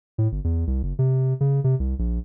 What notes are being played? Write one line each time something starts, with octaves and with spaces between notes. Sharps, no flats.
A2
G1
E2
C2
F#1
C3
C#3
C3
C2
A#1